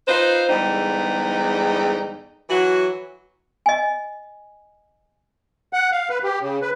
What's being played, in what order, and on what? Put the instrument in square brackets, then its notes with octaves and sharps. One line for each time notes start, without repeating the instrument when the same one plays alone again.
[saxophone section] D#4 F4 B4 C5
E2 G#2 D3 G3 D#4
E3 F#3 F#4
[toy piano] D#5 G#5
[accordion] F#5
F5
B4
G4
C#3
B4